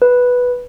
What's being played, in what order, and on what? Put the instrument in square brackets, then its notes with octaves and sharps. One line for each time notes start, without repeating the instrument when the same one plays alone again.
[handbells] B4